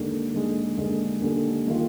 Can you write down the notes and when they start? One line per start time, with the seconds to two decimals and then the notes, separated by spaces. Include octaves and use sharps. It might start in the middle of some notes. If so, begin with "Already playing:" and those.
Already playing: D#2 D3 G#3
0.33 D#2 D3 G#3
0.77 D#2 D3 G#3
1.21 D#2 D3 G#3
1.67 D#3 A#3 F4